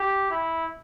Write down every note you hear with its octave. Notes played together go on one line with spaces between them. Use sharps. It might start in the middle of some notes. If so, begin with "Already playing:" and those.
Already playing: G4
E4